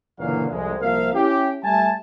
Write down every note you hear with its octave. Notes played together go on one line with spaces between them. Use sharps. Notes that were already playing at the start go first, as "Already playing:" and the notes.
F#1 A#2 D3 E3 F#3 F5
C2 F2 G#3
C2 F3 A#3 A#4 E5 F5
C#4 E4 G4
G3 A3 E5 G#5 A5